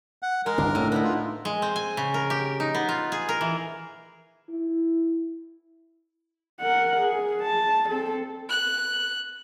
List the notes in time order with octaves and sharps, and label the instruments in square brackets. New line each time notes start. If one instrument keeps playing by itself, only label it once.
[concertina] F#5
[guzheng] G#3 [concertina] A#4
[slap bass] G1 C2 D3 [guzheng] D4
[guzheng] A2 [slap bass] A3
[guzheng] B3 D#4 E4
[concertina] F4
[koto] G#3
C4
G#5
C#3
A#4
G4
D#4
B3
F4
G#4
A#4
E3
[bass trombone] E4
[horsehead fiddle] A#4 F#5
G#4
A5
C4 A4
[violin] F#6